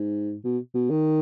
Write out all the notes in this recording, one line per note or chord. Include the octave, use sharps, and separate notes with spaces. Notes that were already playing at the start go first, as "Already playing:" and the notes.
Already playing: G#2
B2
B2
D#3